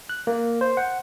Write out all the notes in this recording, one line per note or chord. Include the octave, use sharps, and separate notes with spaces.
F#6
A#3
C5
F#5